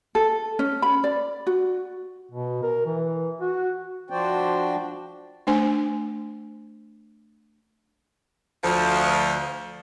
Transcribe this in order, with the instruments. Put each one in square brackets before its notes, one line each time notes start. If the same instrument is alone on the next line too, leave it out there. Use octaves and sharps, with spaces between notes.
[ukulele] A4
C#4
B5
D5
F#4
[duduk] B2
A#4
E3
F#4
[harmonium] F3 D4 F#4 C5 D5 G5
[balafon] A3 D4 C5 G#5
[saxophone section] D2 F3